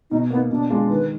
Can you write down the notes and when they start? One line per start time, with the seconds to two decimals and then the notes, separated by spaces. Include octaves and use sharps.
0.10 B2 D#4
0.30 A#3 B3
0.35 D#4
0.50 B2 D4
0.70 G#3 D4 F4
0.90 D#3 B4